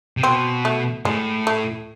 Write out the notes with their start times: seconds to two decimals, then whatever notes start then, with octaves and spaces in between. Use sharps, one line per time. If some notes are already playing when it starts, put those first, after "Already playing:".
0.17 C3
0.23 B2 C4
0.65 A3
1.05 A2 G#3
1.47 A3